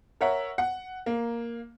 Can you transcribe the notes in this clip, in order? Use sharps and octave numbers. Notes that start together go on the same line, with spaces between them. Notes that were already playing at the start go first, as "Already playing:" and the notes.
A#4 C#5 E5 F#5
F#5
A#3